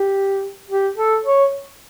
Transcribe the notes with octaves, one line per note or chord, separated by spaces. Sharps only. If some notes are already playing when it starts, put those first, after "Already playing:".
Already playing: G4
G4
A4
C#5